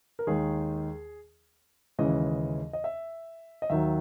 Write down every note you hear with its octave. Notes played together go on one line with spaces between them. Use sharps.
A#4
D#2 D#3 G#3 G#4
D#2 C#3 E3 G#3 D#5
D#5
E5
D#5
D#2 D#3 F#3 E5